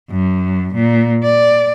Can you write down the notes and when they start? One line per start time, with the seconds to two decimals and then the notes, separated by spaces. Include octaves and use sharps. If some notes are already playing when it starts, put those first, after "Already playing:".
0.10 F#2
0.75 A#2
1.23 D5